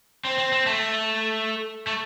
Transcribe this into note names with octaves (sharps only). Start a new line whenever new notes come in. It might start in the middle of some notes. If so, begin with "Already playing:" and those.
C4
C4
C4
A3
A3